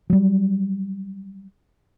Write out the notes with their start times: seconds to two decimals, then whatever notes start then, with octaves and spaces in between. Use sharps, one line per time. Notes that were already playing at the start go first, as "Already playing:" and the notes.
0.10 F#3 G3